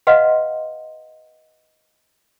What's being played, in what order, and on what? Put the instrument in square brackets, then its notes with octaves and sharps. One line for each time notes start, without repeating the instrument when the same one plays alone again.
[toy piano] B4 D#5 F5 F#5 C6